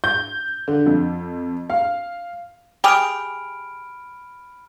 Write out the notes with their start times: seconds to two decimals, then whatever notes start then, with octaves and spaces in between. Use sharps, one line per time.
0.04 G6
0.68 D3
0.86 F2
1.70 F5
2.84 G4 G#4 B5 F6 D7